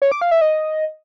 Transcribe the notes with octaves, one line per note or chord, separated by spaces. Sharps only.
C#5
D6
F5
E5
D#5